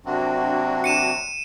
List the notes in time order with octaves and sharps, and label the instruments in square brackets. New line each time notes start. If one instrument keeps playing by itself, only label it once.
[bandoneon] C3 F#3 C4 [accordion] A#3 D4 F#4
[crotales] C#7 D#7 E7